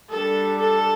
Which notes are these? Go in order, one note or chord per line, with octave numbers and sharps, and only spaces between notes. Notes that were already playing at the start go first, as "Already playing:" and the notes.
G3 D4 A4
A4